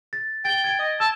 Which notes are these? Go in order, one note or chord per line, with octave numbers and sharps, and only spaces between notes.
A6
G5 A6 G7
G#6 D7
D#5
A5 E6